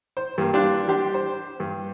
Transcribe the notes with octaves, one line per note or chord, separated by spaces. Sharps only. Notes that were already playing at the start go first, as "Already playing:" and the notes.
C5
G2 G3 A#3
G3 D4 F5 G5 C6 F#6
G3 D4 G4 C6
C5
G2